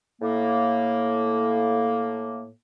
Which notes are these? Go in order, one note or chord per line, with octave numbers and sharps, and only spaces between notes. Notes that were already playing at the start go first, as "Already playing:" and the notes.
A2 A#3